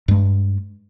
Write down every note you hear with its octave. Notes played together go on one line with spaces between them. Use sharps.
G2 G#3